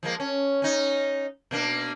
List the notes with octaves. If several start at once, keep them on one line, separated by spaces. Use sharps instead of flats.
F3 G#3 A#3
C#4
C#4 D#4
B2 A#3 D4